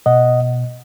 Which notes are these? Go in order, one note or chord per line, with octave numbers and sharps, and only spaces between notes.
B2 D#5 F#5